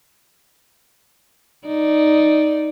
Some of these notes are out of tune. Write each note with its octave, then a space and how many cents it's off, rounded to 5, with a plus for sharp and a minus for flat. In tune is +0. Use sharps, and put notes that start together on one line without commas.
D#4 +0 D5 +0